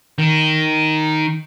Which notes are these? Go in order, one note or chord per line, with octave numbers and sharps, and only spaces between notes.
D#3